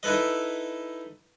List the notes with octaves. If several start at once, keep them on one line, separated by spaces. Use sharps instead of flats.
D#4 E4 A4 B4 D#5